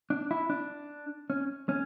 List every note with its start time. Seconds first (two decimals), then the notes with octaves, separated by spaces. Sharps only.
0.10 D4
0.31 E4
0.50 D4
1.30 C#4
1.69 C#4